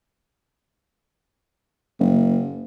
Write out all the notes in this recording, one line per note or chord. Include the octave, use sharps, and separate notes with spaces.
F#1